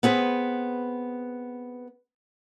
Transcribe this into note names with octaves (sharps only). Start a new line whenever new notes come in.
B3 C4 G#4 B4